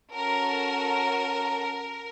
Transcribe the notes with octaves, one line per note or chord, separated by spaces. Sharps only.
C#4 F#4 A4 A#4